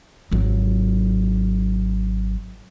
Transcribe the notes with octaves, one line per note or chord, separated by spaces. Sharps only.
G#1 F#3